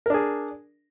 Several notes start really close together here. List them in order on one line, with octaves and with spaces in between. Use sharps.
A#4 D4 G#4